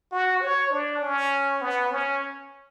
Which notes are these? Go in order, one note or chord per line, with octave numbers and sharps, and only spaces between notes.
F#4
C#5
D4
C#4
B3
C#4